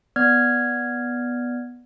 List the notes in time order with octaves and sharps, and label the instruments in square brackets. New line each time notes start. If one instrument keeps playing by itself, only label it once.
[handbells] B3 D5 F6 G#6